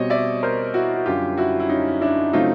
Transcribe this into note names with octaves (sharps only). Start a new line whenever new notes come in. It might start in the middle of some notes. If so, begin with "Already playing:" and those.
Already playing: B2 G3 C4 C#5 D#5
D5 E5
A#4 C5
E4 F#4
F#4
F#2 D3 G3 F4 G4
E4 F#4
E4
C#4 D#4
D4 E4
C#3 F#3 A3 C4 D#4 F4